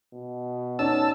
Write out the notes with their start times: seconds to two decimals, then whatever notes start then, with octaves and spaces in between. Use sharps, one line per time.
0.14 B2
0.79 C#4 D#4 D5 A5 E6